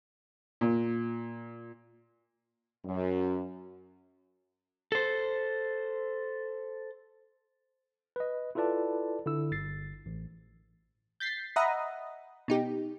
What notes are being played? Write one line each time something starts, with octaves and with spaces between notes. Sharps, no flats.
A#2
F#2
A4 C5
B4 D#5
E4 F4 A4 B4 D5 A5
D3 E4 E6
G1 A6 C7
A1
G6 A6 B6 C7
D#5 E5 F#5 A#5 B5 D#6
B2 D#4 G4